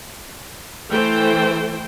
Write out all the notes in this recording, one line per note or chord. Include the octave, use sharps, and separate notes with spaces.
E3 A3 A4 C5 G5